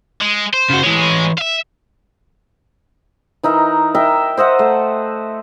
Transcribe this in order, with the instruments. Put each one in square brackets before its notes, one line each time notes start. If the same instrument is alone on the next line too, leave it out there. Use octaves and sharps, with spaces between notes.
[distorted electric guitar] G#3
C5
[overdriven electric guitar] C#3 F#4
[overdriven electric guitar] E3 C#5 [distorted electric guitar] G#3
[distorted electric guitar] E5 F5
[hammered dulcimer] E3 D#4 A#4 E5
A#4 D#5 E5 G5
C5 D#5 E5 F#5
A3